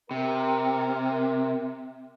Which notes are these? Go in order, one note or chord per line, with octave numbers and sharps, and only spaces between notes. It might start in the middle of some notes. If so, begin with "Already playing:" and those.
C3 A#4